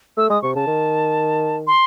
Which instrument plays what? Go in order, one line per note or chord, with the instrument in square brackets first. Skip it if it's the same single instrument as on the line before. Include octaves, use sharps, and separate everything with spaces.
[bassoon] A3 [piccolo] E6
[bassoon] G#3 [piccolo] D#6
[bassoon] C3 [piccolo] C#6
[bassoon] C#3 [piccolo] A5
[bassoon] D#3
[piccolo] C6